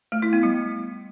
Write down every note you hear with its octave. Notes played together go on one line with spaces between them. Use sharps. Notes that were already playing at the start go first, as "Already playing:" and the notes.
A3
E4
B3
G3